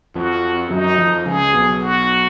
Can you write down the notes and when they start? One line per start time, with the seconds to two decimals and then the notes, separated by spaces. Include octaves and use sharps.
0.15 F2 F3 F#4
0.70 F#2 F#3 D#4
0.98 F2 F3
1.25 C#2 C#3 G#4
1.54 B1 B2
1.81 F#4